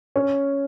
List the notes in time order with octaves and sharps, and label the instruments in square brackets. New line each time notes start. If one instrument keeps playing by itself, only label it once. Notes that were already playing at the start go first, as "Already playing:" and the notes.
[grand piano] C#4